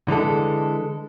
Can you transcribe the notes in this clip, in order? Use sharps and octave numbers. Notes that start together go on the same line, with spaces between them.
D3 E3 G#3 A4